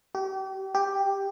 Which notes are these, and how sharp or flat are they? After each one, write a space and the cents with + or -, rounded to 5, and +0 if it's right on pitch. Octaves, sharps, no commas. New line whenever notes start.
G4 -35
G4 +5